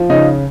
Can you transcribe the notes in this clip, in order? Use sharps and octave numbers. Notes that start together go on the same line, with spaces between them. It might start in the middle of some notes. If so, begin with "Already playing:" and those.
Already playing: F3
C#3 D#4